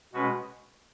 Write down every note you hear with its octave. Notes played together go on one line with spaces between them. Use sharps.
B2 G#3 C#4 F#4 B4